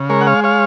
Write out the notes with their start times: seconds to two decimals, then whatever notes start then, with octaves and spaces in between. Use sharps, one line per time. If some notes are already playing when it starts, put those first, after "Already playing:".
Already playing: C#3
0.10 G#3 A#4 C#5
0.21 F#5
0.27 C#5 F5
0.44 C#5 F5